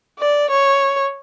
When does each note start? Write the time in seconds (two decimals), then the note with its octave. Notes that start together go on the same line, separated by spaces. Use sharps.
0.19 D5
0.50 C#5